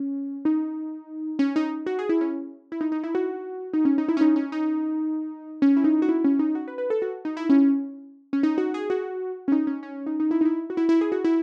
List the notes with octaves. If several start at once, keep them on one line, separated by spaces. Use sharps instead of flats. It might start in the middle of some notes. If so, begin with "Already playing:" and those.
Already playing: C#4
D#4
C#4
D#4
F#4
G#4
E4
C#4
E4
D#4
D#4
E4
F#4
D#4
C#4
D#4
E4
C#4
D#4
C#4
D#4
C#4
E4
D#4
F#4
E4
C#4
D#4
F#4
B4
B4
A4
F#4
D#4
E4
C#4
C#4
D#4
F#4
G#4
F#4
C#4
D#4
C#4
C#4
D#4
D#4
E4
D#4
E4
F#4
E4
E4
G#4
F#4
E4